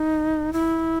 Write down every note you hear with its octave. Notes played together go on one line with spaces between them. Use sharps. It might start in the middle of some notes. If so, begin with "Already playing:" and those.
Already playing: D#4
E4